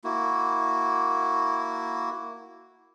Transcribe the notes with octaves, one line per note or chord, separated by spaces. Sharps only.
A#3 E4 F#4